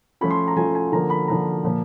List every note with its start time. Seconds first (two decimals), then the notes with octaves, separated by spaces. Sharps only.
0.21 F3 A3 C#4 F4 B5
0.31 C6
0.48 A#5
0.57 F3 A3 C#4 F4 G#5
0.75 G#5
0.92 D3 F3 A#3 A#5
1.10 B5
1.28 D3 F3 A#3 A#5
1.63 A#2 F3 A#3